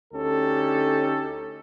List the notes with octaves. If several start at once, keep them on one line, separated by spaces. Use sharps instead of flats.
D2 C#4 D#4 G4 A4